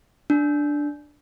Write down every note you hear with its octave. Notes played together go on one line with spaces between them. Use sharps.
D4